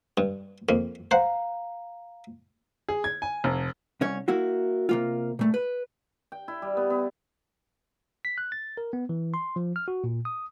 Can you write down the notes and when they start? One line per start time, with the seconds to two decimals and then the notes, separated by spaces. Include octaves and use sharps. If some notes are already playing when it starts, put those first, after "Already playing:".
0.17 G2
0.69 F2 A#3
1.11 C5 F5 F#5 A#5
2.89 G#4
3.04 G#6
3.22 G#5
3.44 F1
4.01 C2 C#4 C#5
4.28 A#3 E4 F#4
4.89 C3 A#3 F4
5.39 A#2 A3
5.54 B4
6.32 G5
6.48 E4
6.62 G3
6.77 B3
6.90 B3
8.25 B6
8.38 F#6
8.52 A6
8.77 A#4
8.93 B3
9.09 E3
9.34 C6
9.56 F3
9.76 F6
9.88 F#4
10.04 A#2
10.25 D#6